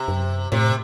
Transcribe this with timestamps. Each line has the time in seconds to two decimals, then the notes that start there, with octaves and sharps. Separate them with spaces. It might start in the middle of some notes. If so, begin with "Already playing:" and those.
Already playing: C3
0.08 F#2
0.52 A2 C3